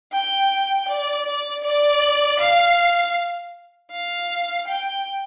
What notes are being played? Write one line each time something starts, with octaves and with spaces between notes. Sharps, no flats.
G5
D5
D5
D5
F5
F5
G5